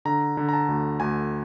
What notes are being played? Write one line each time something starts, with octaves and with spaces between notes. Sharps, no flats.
D3 A#5
D3
A#5
A5
D2
D2 G#5